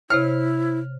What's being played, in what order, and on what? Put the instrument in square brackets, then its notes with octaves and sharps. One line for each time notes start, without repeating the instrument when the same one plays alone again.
[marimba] C3 C5 C#5 [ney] E4 [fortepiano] F6